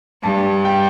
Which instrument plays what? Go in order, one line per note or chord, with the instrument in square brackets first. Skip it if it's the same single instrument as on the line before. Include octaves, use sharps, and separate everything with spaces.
[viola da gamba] G2 G3 [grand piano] A5
[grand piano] G5